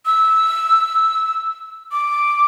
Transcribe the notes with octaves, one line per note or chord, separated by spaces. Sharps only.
E6
D6